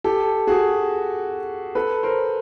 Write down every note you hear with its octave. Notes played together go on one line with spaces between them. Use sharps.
G4 A4
F#4 G#4
A4 B4
A#4 C5